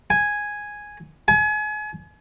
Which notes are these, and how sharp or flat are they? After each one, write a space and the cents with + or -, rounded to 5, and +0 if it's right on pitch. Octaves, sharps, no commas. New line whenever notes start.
G#5 +0
G#5 +35